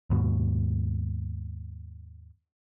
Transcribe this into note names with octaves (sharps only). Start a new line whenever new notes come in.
D#2 G#2 B2